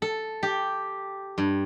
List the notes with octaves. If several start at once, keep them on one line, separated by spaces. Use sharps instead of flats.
A4
G4
G2